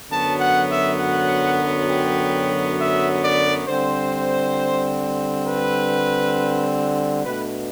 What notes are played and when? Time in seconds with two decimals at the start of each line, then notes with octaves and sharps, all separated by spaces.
0.10 F#2 D3 F#3 B3 A5
0.41 F#5
0.70 E5
1.00 F#5
1.89 G5
2.78 E5
3.23 D5
3.67 D3 G3 C4 C5
5.46 B4
7.25 B2 A3 D4 B4